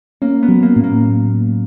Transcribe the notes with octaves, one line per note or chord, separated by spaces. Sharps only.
A#3 C#4
B3
F#3
A#3
A2
A#3